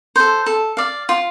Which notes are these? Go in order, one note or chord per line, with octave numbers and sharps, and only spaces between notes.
A4 C5
A4
D5 F5
F4